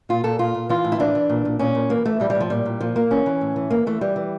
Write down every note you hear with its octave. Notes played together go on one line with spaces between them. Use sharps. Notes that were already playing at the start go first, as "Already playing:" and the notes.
A#2 F4
A#2 A4
A#2 F4
A#2
E3 F4
A2
E4
E3 D4
E3
A#2
A#2
A#2 C#4
A#2
E3 A#3
E3 A3
A2 G3
G3
A2
F3
A#2 G3
A#2
A#2 F3
A#2 A#3
E3 C#4
E3
A2
E3
E3 A#3
E3 A3
E3 G3
E3